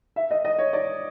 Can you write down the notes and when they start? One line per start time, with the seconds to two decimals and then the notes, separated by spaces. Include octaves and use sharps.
0.16 E5
0.31 D#5
0.45 D#5
0.58 C#5
0.73 D5